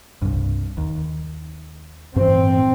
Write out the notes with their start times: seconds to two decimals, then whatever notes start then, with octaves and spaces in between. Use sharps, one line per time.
0.22 C2 G2
0.78 D#2
2.16 G2 E3 C4